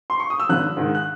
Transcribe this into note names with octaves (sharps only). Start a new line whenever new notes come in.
C6
C#6
D#6
E6
G#1 F#6
G#2 D#3
F#6